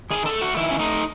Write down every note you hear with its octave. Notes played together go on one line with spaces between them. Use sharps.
D#3 G#4
A4
A3
F#4
D#3 E4
C#4
A3 D#4